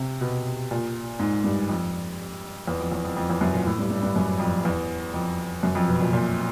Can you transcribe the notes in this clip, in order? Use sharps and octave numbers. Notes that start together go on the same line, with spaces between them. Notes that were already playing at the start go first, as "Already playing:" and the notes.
Already playing: C3
B2
A#2
G#2
G2
F2
E2
F2
E2
F2
F2
E2
F#2
A#2
A2
G2
G2
G2
F#2
F2
E2
F2
F#2
F2
B2
A#2
A#2